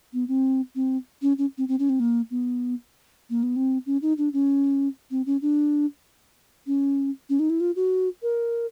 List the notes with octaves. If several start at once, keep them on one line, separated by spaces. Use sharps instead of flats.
B3
C4
C4
C#4
C#4
C4
C4
C#4
C4
A#3
B3
A#3
B3
C4
C#4
D#4
D4
C#4
C4
C#4
D4
C#4
C#4
D#4
E4
F4
F#4
A#4